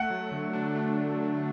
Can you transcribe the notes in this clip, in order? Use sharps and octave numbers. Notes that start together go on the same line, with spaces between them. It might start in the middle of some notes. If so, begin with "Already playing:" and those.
Already playing: A3 F#5
F#3
D3
D4
A3